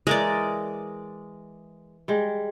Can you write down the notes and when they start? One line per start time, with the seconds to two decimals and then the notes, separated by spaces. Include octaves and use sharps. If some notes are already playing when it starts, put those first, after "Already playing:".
0.07 E3 G#3 A#4 D5 D#5
2.08 G3 G#3